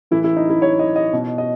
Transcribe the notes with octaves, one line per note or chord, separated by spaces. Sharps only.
A2 E3 E4
E4
D#4
E4
C#5
D#5
D#5
B2
D#5